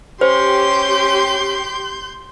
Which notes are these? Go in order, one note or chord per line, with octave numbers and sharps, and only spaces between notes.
C#4 G4 C5 C6 G6